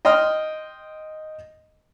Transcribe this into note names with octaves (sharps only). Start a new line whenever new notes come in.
D#5 G5 C6 D#6 F6